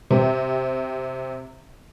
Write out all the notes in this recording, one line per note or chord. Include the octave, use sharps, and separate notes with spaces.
C3 C4